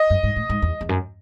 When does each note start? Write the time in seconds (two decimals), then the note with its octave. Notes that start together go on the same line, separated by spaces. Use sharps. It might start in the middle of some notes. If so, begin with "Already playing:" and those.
Already playing: D#5
0.10 F#2
0.23 G#2
0.36 A2
0.49 G#2
0.62 E2
0.81 E2
0.89 F#2